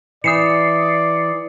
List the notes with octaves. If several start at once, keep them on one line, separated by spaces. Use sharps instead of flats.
E3 D5 D#6 C7 C#7